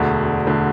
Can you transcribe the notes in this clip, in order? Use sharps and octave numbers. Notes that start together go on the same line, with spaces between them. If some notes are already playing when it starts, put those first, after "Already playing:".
Already playing: E1 D2 D3
D2 D3